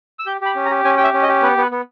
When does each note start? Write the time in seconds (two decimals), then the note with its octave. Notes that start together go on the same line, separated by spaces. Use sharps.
0.19 E6
0.26 G4 G6
0.41 G4 B5
0.55 C#4
0.65 A#5
0.71 G4
0.84 C#4 G#5
0.97 G4 G5
1.04 E5
1.13 C#4
1.23 D#5
1.28 G4
1.42 B3 B4
1.57 B3 B4
1.71 B3